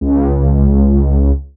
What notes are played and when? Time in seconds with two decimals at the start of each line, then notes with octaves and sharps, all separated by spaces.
0.01 C#2